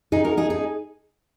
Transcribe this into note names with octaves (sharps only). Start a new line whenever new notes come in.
D#4 G#4
F#4 A#4
D#4 G#4
D#4 G#4